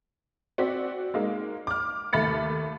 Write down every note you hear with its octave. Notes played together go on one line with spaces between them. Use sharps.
C4 F#4 D5 B6
G#3 A#3 D#4
D6 F6
D#2 A3 B5 A6 C#7